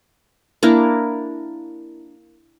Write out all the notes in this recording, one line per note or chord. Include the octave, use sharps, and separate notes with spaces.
A#3 D4 E4 A#4